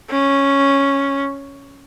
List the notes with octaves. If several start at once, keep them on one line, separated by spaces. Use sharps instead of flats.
C#4